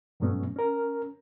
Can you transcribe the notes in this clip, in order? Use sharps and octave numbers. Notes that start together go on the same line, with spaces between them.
G2 A#2 F#3 A3 B3 C#4
C#4 A#4